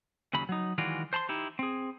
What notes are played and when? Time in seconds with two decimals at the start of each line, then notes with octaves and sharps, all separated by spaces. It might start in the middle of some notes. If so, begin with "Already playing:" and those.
0.33 D#2 C#3 F#3 B5
0.49 F#3 D#4
0.78 D#3 E3 G#3 F4 F#4 D5
1.13 C5 A5 B5 C6
1.29 D#4 E4 G4
1.59 C4 G#4